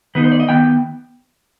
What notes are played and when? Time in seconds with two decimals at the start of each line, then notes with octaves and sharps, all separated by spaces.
0.15 D#3 B3 D#4 B4
0.24 C5
0.32 D5
0.40 D#5
0.49 D#3 B3 G5